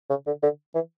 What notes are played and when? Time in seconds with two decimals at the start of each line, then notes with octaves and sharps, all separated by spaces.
0.09 C#3
0.27 D3
0.43 D3
0.75 E3